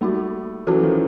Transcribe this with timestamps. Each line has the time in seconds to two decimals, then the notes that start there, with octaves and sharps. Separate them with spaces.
0.01 G3 A3 A#3 D#4 F#4
0.67 E3 F#3 C#4 F#4 A4
0.83 D#3 F3